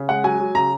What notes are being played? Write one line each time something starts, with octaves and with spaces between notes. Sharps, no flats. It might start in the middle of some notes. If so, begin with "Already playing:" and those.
Already playing: C#3
G#3 F#5
F#3 G#5
F#3
C#3 A#5